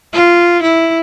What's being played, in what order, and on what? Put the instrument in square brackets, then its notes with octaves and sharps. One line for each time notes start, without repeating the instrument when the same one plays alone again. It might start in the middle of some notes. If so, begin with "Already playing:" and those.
[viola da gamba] F4
E4